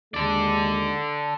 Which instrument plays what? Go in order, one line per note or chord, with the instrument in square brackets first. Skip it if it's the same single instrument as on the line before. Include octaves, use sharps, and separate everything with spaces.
[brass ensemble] D#2 G#3 [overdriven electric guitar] A4 D5